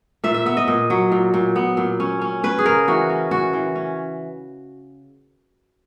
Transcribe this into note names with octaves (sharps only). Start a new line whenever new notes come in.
A#2 E5
E5
B3 E5
D#5
A#2
F#3
A#2
A#2
B3
A#2
C#4
C#4
C#4 B4
G#4
C#3 A#4
E3 F#4
C#4
E3 F#4
E3
C#4